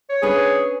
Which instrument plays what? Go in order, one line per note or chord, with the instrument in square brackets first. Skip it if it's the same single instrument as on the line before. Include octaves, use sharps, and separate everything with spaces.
[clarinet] C#5
[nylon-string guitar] C#4 D4 B4 [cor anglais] G#4